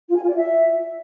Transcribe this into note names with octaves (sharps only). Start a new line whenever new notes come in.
F4
G#5
F4
D5
E5